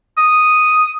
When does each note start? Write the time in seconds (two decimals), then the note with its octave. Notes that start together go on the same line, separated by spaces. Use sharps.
0.17 D#6